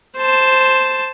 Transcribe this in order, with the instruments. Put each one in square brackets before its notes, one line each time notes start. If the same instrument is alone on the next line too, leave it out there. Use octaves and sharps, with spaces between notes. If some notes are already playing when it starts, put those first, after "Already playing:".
[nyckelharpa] C5 A5